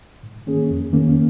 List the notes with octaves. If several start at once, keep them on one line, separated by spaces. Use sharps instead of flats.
G#2
D#3 A#3 C#4 G#4
F2
D#3 A#3 C#4